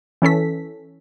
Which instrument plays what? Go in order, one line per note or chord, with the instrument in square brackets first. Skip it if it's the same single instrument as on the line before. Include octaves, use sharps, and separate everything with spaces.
[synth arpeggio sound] E3 C#4 A4 B6